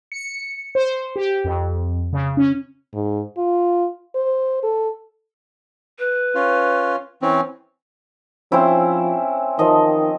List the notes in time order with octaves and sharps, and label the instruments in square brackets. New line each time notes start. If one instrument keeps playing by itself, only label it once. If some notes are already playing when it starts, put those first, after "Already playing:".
[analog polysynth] C#7
C5
G4
F2
C#3
C#4
[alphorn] G#2
F4
C5
A4
[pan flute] B4
[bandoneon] C#4 F4
E3 C4 C#4
[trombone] F3 [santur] C4 C#4 [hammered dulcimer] E4
[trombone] D#3 [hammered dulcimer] F3 D#5